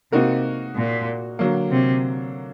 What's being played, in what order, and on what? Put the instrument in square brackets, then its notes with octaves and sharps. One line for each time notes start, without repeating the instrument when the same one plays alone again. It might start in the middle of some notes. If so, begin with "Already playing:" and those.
[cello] C3 [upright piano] A#3 D#4 F#4 A#4
[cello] A#2
[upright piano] D3 F#3 A#3
[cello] C3